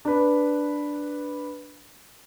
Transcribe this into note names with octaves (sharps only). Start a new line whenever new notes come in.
D4 B4